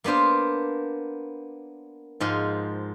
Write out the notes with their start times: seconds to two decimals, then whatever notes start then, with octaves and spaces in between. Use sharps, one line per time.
0.04 A#3 B3 D4 C5 F5
2.20 G#2 F3 D#5 F5